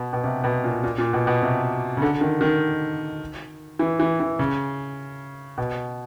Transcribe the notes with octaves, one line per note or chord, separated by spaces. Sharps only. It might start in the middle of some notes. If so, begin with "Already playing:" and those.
Already playing: B2
B2
C3
B2
A#2
A#2
A#2
B2
B2
C3
C#3
D3
D#3
D#3
E3
E3
E3
C#3
B2